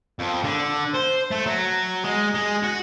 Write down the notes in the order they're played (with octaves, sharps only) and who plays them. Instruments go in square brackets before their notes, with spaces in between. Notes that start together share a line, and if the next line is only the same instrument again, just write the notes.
[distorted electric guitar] F2
D3
C5
A3
F#3
G#3
G#3
F#4